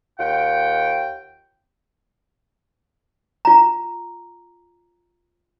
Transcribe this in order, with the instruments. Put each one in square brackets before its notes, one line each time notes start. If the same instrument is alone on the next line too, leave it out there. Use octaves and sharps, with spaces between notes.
[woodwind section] D#2 F4 F#5 G5
[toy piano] F4 A#5